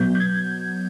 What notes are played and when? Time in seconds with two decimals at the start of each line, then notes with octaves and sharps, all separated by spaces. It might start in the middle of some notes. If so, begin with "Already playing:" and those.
Already playing: B2 F#3 B3 G6
0.15 G6
0.20 G#6